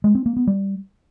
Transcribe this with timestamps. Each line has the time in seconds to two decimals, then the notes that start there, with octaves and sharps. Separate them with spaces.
0.04 G#3
0.15 C4
0.26 A#3
0.37 B3
0.47 G3